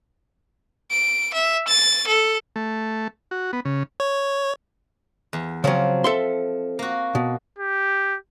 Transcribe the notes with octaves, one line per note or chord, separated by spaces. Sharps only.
D7
E5
A6
A4
A3
F#4
B3
C#3
C#5
E2
C#3 F3 F#3 C4
A4 E5 C6
A#3 F#4
B2
G4